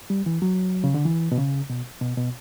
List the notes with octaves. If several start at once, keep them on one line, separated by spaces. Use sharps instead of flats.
G3
E3
F#3
C#3
D3
E3
B2
C#3
B2
B2
B2